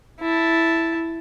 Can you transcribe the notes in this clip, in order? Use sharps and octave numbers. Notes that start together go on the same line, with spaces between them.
E4 A5